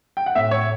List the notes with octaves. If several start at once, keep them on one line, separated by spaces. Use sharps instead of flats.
G5
F#5
A2 E5
C#5